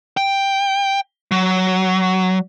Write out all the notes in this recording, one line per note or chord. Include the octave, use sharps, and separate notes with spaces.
G5
F#3